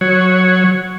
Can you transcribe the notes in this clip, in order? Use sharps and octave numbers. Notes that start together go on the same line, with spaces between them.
F#3 C#5